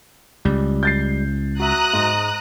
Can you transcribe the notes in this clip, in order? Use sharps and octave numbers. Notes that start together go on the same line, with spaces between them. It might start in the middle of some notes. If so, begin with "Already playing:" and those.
C#2 G3
G6 A6 C7
F#4 E5 A#5 D#6 F#6
G#2 G#3